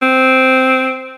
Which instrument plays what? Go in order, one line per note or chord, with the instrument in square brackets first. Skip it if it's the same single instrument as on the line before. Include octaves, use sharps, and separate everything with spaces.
[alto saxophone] C4